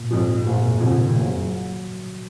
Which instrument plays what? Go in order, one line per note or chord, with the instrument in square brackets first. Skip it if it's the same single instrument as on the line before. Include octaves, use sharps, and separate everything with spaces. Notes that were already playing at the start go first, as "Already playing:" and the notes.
Already playing: [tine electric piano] A#2
[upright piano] F2 F3 [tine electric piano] G#2
[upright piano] F#1 [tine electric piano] A#2
[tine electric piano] B2
[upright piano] F2 F3 [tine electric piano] C#3
[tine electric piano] D#3
[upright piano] F#1 [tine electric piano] F#3